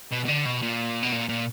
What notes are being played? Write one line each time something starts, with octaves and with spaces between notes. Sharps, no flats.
B2
B2
D3
B2
A#2
B2
A#2
A#2